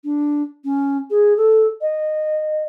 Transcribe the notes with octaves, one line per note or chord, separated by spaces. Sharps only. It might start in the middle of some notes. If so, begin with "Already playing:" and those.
D4
C#4
G#4
A4
D#5